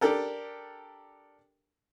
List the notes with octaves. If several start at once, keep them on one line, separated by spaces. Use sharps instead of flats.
D4 G4 A4 A#4